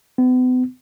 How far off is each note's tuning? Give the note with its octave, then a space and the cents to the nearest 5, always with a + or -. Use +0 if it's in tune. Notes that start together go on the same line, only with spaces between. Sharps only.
B3 +40